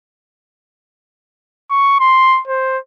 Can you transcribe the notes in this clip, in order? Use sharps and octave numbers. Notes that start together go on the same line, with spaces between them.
C#6
C6
C5